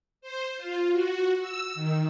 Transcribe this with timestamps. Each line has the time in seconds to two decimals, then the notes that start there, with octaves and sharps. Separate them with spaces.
0.21 C5
0.57 F4
0.91 F#4
1.40 E6
1.75 D#3